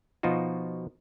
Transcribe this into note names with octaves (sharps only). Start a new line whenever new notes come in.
B2 F3 D#4 F4 F#4